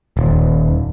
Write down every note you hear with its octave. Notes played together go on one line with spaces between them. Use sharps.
D#1